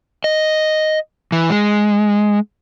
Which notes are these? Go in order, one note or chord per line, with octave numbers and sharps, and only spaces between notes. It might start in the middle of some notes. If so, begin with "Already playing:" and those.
D#5
E3
G#3